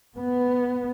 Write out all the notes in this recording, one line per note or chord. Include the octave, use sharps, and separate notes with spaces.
B3